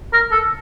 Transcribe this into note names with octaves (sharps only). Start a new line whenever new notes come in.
A#4
A4